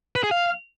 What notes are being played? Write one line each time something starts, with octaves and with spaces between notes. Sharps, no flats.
B4
G#4
F5